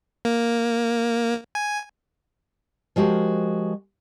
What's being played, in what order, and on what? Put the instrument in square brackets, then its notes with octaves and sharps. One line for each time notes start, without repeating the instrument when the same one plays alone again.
[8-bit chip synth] A#3
G#5
[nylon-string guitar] F3 G#3 F#4 G4 A#4